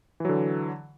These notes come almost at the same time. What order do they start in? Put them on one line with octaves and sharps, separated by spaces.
E3 F#3 D3